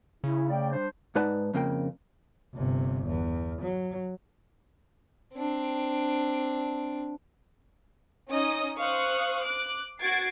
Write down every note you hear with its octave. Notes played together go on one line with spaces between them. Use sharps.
C#3 E4
A3 D5 G5
G3 D4 C5
G#2 D#4 B4 D5 F#5 A5
F2 C#3 A#3 G5
G1 C3
E2
F#3
C4 D4
C#4 D#4 D#5 D#6
C5 F5 C#6 D#6 F#6
D6 F#6
F#4 G#6 A6 C7 D7